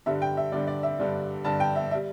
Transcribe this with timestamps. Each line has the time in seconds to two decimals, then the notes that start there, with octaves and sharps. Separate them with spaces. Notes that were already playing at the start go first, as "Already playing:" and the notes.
0.06 G2 D3 G3 E5
0.22 G5
0.37 E5
0.52 G2 D3 G3 D5
0.67 D5
0.83 E5
0.99 G2 D3 G3
1.45 G2 D3 G3 A5
1.60 G5
1.76 E5
1.91 E5
1.95 G3